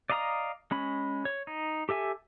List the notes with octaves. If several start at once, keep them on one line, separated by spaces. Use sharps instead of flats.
D5 D#5 F5 A#5 D#6
G#3 C#4 B5
C#5
D#4
G4 A4 E5 G#5